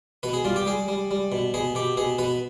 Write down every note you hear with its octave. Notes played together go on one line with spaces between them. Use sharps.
B2 B4
G#4
G3 F4
G4
G3 G#4
G3
G3
B2
B2 G#4
B2 G4
B2 G#4
B2 B4